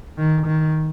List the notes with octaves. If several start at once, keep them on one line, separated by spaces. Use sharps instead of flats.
D#3
D#3